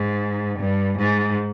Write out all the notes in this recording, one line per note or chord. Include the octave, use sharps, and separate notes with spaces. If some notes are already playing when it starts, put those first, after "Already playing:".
Already playing: G#2
G2
G#2